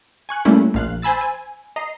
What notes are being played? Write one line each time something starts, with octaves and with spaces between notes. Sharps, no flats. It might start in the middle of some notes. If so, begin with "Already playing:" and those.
G#5 C#6 F#6
G3 A3 A#3 C#4 E4
A#1 F5 F#6
C5 G#5 B5 E6 A6
G#5
D#5 A#5 C7